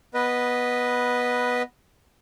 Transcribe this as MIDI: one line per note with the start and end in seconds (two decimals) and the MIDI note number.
0.14 1.62 59
0.14 1.62 71
0.14 1.62 75